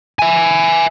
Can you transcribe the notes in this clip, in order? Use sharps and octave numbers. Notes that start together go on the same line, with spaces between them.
E5 G#5